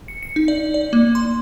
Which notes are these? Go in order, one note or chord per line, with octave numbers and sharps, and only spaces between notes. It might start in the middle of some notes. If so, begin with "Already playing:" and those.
C#7
C#7
D#4
D5
D5
A#3
C6